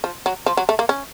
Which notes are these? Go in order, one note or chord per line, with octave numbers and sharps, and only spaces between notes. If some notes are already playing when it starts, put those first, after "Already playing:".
F3
F#3
F3
F#3
A3
A#3
C#4